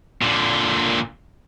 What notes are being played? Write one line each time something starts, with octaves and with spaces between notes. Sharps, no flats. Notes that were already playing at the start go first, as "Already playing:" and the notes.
A#2 D3